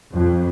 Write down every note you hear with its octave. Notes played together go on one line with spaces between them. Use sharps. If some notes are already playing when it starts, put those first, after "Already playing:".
F2